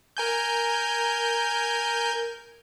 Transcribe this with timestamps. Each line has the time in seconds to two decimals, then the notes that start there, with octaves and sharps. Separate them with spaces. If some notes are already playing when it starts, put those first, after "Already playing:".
0.17 A#4 G#5 G6